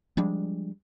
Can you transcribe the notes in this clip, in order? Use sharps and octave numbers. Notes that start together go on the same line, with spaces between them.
F3 G3 G#3 D4